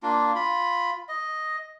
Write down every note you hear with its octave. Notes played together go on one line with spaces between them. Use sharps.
A#3 D4 F4
F4 B5
D#5